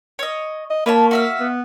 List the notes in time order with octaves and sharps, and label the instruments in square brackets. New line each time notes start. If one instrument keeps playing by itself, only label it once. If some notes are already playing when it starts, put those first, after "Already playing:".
[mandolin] C#5 D#5
[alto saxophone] D#5
[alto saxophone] A#3 [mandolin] B4 C#5 A5
[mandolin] F#4 E5 F5
[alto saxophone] B3